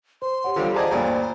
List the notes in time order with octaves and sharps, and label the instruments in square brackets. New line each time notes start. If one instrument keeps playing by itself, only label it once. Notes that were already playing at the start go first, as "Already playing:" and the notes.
[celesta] C5 [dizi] C6
[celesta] G4 C#5 F#5
[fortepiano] D3 G3 [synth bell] F4 C5 F5
[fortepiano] G#4 D5 D#5 [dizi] C5 [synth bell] A5 A#5 G#6
[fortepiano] D2 G2 A#2 [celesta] C#5 D5 F5 [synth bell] A#5 B5